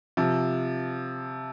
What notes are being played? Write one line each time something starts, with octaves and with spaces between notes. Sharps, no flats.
C3 F3